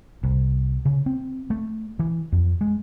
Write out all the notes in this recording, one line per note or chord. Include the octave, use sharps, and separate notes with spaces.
C2
C#3
C4
A3
E3
F2
G#3